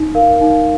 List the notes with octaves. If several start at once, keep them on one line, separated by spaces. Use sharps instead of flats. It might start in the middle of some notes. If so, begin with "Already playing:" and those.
Already playing: D#4
A#4 F5
D#4